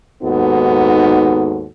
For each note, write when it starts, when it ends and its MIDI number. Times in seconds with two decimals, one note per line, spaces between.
0.23 1.66 39
0.23 1.66 44
0.23 1.66 59
0.23 1.66 63
0.23 1.66 66
0.23 1.66 69